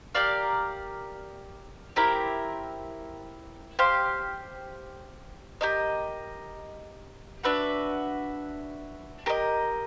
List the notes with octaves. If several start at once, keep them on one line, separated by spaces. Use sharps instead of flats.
G4 A#4 D5 F5
C4 E4 G4 A#4
G4 C5 F5
G4 A#4 D#5
D4 F#4 B4 E5
G4 A#4 D#5